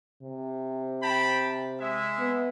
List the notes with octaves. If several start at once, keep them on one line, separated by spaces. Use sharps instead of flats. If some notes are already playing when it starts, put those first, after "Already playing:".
C3
G5 A5 B5
G#3 E5
B3